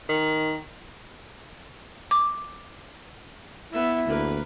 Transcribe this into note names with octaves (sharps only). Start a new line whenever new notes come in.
D#3
D6
B3 E4 E5
D2 A#3 B4